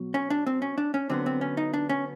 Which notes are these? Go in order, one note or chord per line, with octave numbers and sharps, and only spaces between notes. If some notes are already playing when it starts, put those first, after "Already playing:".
Already playing: B2 F#3
C#4
D4
C4
C#4
D4
C#4
D3 F#3 B3 C4
C4
C#4
D#4
D4
C#4